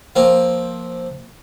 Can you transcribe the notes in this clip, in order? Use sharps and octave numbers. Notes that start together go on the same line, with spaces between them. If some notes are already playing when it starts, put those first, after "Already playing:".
F3 A#3 C4